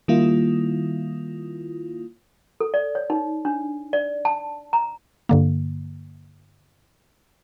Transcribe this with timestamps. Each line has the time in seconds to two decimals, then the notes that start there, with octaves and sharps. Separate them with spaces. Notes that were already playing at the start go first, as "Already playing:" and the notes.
0.08 D#3 G3 A#3 E4 F4
2.61 A4
2.74 D5
2.95 C#5
3.10 D#4
3.45 D4
3.93 D5
4.25 A5
4.73 A#5
5.29 G2 D3 A#3